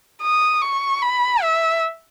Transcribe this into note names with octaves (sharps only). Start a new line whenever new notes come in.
D#6
C#6
B5
E5